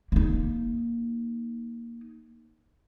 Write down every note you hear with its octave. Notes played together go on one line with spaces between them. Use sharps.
A#3 D#4